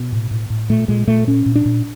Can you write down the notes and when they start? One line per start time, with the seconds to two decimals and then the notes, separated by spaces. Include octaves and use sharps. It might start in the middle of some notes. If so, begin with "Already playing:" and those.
Already playing: B2 B3
0.12 A2
0.31 A2
0.50 A2
0.70 A#2 A3
0.88 A#2 G#3
1.07 A#2 A3
1.27 A#2 C#4
1.46 A#2
1.56 D4
1.65 A#2